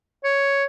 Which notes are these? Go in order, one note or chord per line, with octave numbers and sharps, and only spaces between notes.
C#5